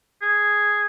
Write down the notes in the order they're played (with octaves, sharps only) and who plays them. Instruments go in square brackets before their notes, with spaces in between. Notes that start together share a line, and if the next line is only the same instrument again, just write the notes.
[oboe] G#4